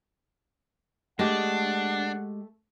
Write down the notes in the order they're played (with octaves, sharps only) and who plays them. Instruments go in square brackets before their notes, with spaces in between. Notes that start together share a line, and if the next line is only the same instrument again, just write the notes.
[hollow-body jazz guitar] G#3 G4 [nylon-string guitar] A3 D#5 [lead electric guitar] D4 [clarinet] F#5